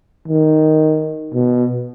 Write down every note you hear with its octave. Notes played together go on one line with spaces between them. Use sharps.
D#3
B2